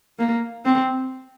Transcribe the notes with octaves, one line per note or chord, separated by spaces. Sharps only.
A#3
C4